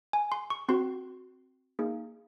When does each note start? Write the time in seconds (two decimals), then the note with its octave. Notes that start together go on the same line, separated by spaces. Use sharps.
0.13 G#5
0.32 C6
0.50 C#6
0.69 C4 F#4 C6
1.79 A#3 D#4 G#4